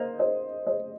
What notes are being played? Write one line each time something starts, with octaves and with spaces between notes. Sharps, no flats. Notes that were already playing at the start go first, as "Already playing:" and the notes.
Already playing: A#3 C5 D#5
C5 D#5
C5 D#5